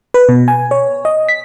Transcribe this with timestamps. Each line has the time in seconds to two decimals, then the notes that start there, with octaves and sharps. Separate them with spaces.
0.14 B4
0.29 B2
0.48 G#5
0.71 C#5
1.05 D#5
1.29 B6